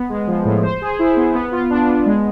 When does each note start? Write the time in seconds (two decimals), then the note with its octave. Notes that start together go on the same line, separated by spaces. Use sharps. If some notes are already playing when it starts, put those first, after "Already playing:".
Already playing: B3
0.09 G#3
0.27 F3
0.45 A2
0.63 C5
0.81 G#4
0.99 E4
1.17 B3
1.35 B3
1.52 F4
1.70 D4
1.87 B3
2.06 G#3